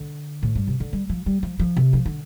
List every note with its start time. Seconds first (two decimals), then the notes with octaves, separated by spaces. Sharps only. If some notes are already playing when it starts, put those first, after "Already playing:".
Already playing: D3
0.43 A2
0.55 G2
0.68 C3
0.80 D3
0.93 G3
1.09 F3
1.26 G3
1.43 F3
1.59 F3
1.77 C3
1.93 F3
2.06 D3